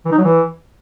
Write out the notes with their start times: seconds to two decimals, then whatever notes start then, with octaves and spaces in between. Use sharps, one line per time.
0.05 E3
0.11 D#4
0.18 F#3
0.24 E3